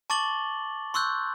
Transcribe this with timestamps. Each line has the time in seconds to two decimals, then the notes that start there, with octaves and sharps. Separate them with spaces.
0.10 A5 C#6 D6 A6 F#7 G7
0.94 C6 C#6 E6 F#6 G6